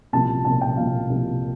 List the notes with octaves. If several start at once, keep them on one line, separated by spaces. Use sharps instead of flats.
C2 A#2 F3 A5
C2 A#2 F3 A5
G5
C2 A#2 F3 F5
C2 A#2 F3